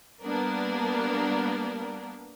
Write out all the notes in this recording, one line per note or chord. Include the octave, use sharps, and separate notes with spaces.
G3 A#3 B3 D4 A#4